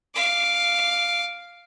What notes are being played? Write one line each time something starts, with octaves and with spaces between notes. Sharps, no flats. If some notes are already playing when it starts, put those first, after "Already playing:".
F5 D6